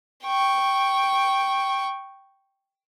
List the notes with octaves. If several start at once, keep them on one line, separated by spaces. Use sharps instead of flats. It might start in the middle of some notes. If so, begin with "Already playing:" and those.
G5 C#6